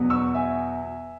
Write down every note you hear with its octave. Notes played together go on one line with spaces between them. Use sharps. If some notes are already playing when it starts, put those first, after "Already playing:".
Already playing: E2 B2 F#3 B3
C#6 E6
E5 G#5